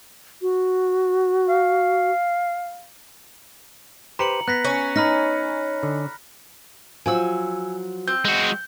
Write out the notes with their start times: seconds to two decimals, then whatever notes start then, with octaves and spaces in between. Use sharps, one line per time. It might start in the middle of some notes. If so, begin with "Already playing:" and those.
0.42 F#4
1.49 F5
4.19 G4 B4 C5 A#5 C#7 F#7
4.48 B3 F#6 A#6 B6
4.65 C#4
4.96 D#4 B5 F6 A#6
5.83 D3
7.06 F3 F#3 G#5 E6
8.08 C4 G6
8.25 G#3 F#4